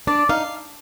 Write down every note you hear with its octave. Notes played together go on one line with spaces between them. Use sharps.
D4 D5
D#4 F5